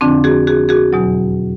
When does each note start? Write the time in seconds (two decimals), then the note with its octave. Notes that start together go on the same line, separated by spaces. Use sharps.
0.01 F2 D3 F3 C4 D4
0.24 F#4 G#4
0.47 F#4 G#4
0.69 F#4 G#4
0.93 E2 B2 F#3